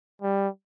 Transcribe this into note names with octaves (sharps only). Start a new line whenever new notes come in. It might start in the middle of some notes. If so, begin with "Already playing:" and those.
G3